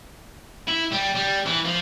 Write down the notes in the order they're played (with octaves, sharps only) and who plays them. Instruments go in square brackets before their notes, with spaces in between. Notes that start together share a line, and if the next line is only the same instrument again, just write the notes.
[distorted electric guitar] E4
G3
G3
E3
F3